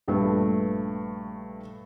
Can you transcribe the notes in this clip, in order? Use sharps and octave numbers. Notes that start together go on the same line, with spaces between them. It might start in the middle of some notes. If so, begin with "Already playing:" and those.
A#1 G2 A3 B4